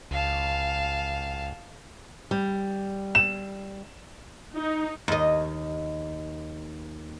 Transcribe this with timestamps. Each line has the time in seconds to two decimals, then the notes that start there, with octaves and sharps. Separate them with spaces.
0.11 C#2 F5 A5
2.31 G3
3.15 E7
4.55 D#4
5.08 D#2 D#5